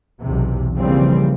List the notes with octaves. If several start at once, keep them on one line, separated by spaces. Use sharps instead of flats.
B1 E2 C3
C#3 E3 F3 G3 A#3 C4